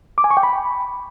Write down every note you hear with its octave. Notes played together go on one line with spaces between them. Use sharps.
D6
G#5
C#6
G5
B5